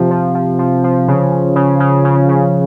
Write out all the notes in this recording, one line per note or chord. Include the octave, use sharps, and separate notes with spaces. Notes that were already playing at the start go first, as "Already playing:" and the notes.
Already playing: C3 F3
F3
F3
F3
F3
C#3
C#3
C#3
C#3
C#3
C#3